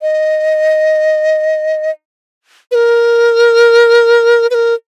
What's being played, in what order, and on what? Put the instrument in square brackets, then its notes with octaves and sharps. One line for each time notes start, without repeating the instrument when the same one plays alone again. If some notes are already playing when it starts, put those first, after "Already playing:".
[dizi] D#5
B4
A#4
B4
A#4